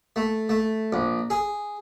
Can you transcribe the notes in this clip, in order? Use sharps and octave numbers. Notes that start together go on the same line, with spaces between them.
A3
A3
A#1
G#4